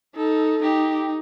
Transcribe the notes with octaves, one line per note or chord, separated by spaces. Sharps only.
D#4 A4
D#4 G4